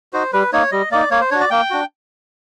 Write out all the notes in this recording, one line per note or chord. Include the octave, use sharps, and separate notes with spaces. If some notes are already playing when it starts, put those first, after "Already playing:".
D#4 F#4 C5
G3 B4
A#3 D#4 C#5
G3 D#5
A#3 D#4 D5
A#3 C#5
C5
D4 F#4 C#5
D5
A#3 G5
D4 F#4